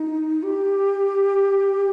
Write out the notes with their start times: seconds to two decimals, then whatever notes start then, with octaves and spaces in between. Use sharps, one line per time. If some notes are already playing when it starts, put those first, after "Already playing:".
Already playing: D#4
0.43 G4